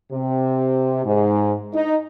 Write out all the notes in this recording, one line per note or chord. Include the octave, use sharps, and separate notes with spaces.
C3
G#2
D#4